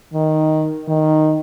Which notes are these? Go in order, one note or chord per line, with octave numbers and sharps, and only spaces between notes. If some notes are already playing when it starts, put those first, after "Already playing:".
D#3
D#3